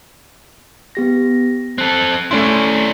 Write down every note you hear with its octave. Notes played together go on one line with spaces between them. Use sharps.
B3 G4 A#6
C4 A4 F#6
A3 C#4 E4 D5 C6